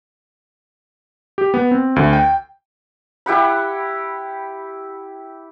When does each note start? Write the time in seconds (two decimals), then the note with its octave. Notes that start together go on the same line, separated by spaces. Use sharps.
1.38 G4
1.54 B3
1.71 C4
1.96 D2
2.13 G5
3.26 E4 G4 F#5 B5